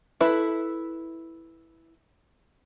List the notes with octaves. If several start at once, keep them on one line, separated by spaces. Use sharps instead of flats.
E4 A4 B4